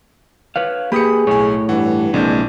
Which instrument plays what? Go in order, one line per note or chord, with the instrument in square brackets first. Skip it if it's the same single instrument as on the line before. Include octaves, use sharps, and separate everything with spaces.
[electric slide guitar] B4 C#5 F5
[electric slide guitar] A#3 G4 B4 [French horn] G#4 [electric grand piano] B5 D#6 C#7
[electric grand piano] B1 G#5 [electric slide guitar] A2 C#5
[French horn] G2 [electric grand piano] E3 F#5
[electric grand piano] A#1 E3 G6 [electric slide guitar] C3 G#3 A#3 [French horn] D4